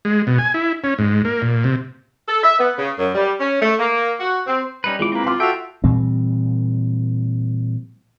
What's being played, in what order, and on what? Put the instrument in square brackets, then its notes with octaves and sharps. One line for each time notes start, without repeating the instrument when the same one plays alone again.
[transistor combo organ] G#3
B2
G#5
E4
C#4
G#2
A#3
A#2
C3
[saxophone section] A4
E5
B3
C#3
F#2
G3
C#4
A3
A#3
F#4
C4
[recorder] G3 [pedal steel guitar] C#4 D#4 B4
[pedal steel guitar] E3 D6 [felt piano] G#3 E4 F4
[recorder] A#3 [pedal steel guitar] C4 B4
[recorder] F4 [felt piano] C6 D6 F6
[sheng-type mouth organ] F#4 A4 E5 [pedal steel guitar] F5 G5
[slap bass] A#2 E3 G3 C4